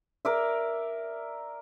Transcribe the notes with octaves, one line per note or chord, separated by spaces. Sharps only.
A#4 D5 E5